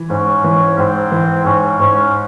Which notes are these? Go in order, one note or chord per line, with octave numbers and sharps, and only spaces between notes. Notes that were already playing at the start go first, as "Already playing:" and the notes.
Already playing: E3
G#2 C#4
E3
G#2 C4
E3
G#2 C#4
G#2 C#4